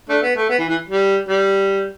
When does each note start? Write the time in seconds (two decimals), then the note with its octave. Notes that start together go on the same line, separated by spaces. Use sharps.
0.09 A3 D4
0.22 B3
0.36 A3
0.49 B3
0.58 E3
0.69 E3
0.89 G3
1.28 G3